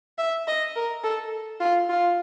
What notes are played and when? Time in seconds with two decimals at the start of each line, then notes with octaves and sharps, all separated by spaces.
0.18 E5
0.47 D#5
0.76 A#4
1.04 A4
1.60 F4
1.89 F4